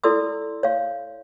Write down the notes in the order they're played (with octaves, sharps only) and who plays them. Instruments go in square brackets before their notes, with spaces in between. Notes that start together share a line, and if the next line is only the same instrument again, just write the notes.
[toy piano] E4 A4 D5 C6 E6
C#5 F5